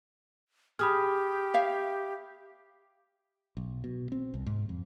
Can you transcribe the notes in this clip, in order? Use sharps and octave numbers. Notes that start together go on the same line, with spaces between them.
G4 G#4 B5 D#6 F6
C#5 E5 F5
B1
B2
C4
C2
G#2
F2